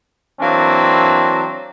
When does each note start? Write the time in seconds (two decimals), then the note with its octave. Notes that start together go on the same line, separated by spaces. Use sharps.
0.41 E3 F#3 A#3 C4 D4